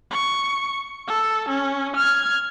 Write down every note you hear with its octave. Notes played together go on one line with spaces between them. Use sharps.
C#6
A4
C#4
F6 G#6